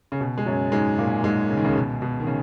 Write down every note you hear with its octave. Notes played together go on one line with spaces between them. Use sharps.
C#3
B2
G#3
F#2 F#3
G#2 G#3
A#2 A#3
G#2 G#3
C#3
D#3
C#2 C#3
B2
B2
D#3
C#3